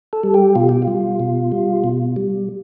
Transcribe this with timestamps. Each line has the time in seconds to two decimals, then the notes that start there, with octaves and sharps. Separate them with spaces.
0.13 A4
0.23 G3
0.34 G4
0.55 B2 F4
0.69 G4
0.82 F4
0.88 G3
1.20 B2
1.52 G3
1.84 B2
2.16 G3